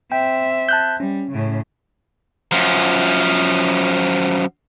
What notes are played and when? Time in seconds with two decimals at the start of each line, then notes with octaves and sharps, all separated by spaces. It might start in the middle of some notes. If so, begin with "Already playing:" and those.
0.12 C4 E5 G5
0.69 A5 F#6 G6
1.00 G3 C#4
1.31 A2 C#3
2.52 F#2 F3